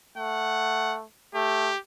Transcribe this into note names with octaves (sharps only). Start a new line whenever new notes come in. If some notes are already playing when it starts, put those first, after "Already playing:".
A3 F#5
A3 G4